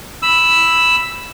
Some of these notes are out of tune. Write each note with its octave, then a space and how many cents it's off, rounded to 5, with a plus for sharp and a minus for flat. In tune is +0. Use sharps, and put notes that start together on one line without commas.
B5 +0 E6 +0